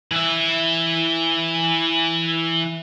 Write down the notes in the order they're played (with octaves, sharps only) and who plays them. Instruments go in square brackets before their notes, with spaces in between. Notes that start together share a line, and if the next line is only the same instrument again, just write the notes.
[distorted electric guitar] E3 E5